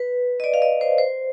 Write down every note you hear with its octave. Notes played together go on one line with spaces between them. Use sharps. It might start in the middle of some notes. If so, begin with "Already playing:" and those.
Already playing: B4
D#5
D5
F5
D#5
C5
C5